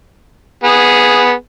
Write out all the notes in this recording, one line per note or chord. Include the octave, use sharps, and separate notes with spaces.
B3 G#4